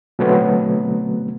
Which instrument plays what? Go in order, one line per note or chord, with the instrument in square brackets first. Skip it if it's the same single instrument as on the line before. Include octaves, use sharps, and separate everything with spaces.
[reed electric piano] B2 D3 F#3 A3 B3 C4